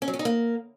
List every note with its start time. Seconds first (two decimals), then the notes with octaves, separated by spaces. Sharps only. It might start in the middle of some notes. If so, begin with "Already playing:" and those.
0.02 C#4
0.08 F#3
0.13 C#4
0.19 D#4
0.25 A#3